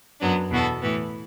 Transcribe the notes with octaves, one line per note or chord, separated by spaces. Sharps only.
F#2 F#3 B3 D4
E2 B2 B3 F#4 A4
A2 E3 B3